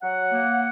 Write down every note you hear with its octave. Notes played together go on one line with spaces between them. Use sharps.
F#3 F#5
A#3